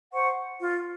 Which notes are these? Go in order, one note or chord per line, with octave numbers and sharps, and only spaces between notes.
C5 F#5 C#6
F4